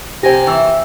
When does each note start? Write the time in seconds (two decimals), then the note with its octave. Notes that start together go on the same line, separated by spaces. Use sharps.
0.23 C3 G4 C5 G5 G#5 A#6
0.47 E3 E6